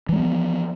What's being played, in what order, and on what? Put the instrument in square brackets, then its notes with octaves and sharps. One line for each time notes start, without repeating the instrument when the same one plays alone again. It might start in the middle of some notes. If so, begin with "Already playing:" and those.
[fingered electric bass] E3
G#3
B3
F3